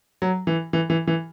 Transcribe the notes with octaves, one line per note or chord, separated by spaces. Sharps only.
F#3
E3
E3
E3
E3